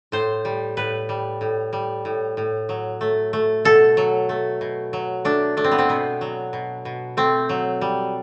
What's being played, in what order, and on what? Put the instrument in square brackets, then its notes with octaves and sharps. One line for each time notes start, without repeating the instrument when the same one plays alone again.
[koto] A2 C5
G3
A2 B4
G3
A2
G3
A2
A2
F#3
A3
A3
B2 A4
F#3
A3
B2
F#3
A3 D4
A3 D4
C4
B3
C4
B2 B3
F#3
B2
B2
A3 C4
F#3
G3